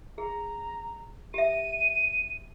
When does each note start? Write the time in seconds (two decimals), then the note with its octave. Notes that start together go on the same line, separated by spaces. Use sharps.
0.18 G#4 A#5
1.34 G4 E5 D#7